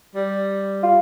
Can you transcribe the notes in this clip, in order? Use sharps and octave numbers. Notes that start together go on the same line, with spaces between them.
G3
F4